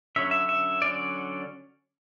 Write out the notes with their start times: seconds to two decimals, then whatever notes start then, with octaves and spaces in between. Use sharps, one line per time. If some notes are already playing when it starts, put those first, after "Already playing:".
0.16 D3 F#3 C#4 E5
0.31 E5
0.49 E5
0.82 D3 F#3 C#4 D5